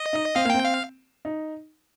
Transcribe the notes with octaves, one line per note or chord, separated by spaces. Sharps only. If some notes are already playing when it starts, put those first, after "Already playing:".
Already playing: D#5
D#4
C4 F5
A#3
C4 G5
F5
D#4